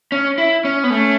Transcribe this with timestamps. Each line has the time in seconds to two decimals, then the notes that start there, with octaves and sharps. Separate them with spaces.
0.12 C#4
0.38 E4
0.65 C#4
0.84 B3
0.90 A3 C#4